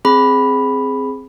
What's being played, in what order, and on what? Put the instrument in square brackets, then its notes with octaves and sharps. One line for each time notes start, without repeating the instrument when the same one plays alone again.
[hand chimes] C4 G#4 B5